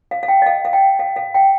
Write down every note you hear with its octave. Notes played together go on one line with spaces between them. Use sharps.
F5
F5
G5
D#5
F5
F5
G5
F5
F5
G5